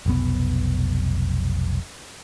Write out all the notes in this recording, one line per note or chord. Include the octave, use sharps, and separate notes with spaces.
F1 B1 B3